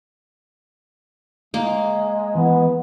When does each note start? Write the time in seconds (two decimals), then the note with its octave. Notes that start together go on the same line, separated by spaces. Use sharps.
1.54 G#3 A#3
2.35 E3 B3